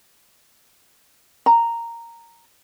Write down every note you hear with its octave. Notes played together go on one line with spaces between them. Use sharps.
A#5